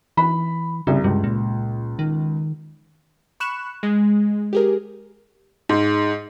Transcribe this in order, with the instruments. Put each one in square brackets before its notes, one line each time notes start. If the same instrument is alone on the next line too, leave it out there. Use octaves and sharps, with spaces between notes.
[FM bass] E3 [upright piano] B5
[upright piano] C2 [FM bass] C#3
[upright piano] C#2 [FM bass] G2
[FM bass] A#2
D#3
[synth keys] B5 C#6 F#6 C#7 E7
G#3
G4 G#4 A#4
[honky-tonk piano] G#2